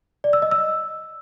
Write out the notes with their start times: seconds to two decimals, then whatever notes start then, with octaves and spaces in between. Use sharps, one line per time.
0.24 D5
0.33 E6
0.42 D#5
0.51 E6